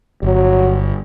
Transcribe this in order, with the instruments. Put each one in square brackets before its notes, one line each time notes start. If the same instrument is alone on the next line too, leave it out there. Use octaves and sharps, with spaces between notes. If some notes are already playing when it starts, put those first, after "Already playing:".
[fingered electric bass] G1 [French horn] F#3